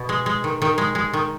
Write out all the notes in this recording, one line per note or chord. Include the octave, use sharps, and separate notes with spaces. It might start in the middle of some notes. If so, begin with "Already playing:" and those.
Already playing: B2
G#3
G#3
D#3
D#3
G#3
G#3
D#3